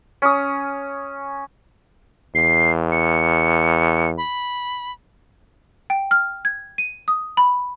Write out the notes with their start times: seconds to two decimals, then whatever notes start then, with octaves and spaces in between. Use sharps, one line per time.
0.22 C#4 D#6
2.35 E2 C7
2.92 C#7
4.18 B5
5.90 G5
6.11 F6
6.45 G#6
6.78 D#7
7.08 D#6
7.37 B5